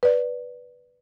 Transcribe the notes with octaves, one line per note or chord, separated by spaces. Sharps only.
B4 D5